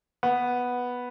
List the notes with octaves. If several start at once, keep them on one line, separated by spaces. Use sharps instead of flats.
B3